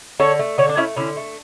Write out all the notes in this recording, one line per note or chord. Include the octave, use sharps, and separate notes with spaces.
D3 A4 C#5
A3
D3 A4 C#5
D4
A3 C#4 E4
D3 C#4 E4
A3